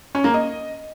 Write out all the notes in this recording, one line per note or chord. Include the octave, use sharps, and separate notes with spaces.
C#4
A#3
D#5